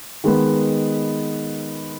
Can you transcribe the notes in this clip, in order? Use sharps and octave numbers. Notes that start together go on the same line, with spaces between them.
D#3 G#3 B3